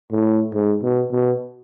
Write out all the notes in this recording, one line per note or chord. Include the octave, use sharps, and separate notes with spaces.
A2
G#2
B2
B2